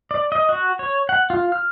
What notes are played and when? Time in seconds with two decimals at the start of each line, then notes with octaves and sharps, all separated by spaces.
0.11 D5
0.32 D#5
0.49 F#4
0.79 C#5
1.09 F#5
1.30 F4
1.52 F6